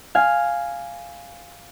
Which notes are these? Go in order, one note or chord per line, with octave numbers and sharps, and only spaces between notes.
F5 G#5